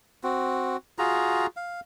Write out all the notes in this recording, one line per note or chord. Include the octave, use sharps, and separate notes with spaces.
C4 F#4
F4 F#4 G#4 A#5
F5